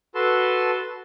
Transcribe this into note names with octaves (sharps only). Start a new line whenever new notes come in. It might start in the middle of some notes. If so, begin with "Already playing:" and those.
F#4 A4 B4 A5 C6